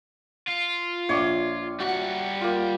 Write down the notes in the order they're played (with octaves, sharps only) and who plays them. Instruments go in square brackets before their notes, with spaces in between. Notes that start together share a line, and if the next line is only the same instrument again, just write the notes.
[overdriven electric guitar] F4
[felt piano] A#1 [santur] C#5 D5
[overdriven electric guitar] G3 F#5 [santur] F#4
[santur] A#3 F4